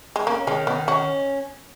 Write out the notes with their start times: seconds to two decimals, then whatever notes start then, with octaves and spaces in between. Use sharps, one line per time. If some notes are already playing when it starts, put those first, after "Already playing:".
0.16 G#3
0.27 A#3 C#4
0.47 D#3 G#3
0.67 D#3 B3
0.88 C#4 F#4